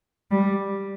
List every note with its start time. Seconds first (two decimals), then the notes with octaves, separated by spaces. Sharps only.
0.31 G3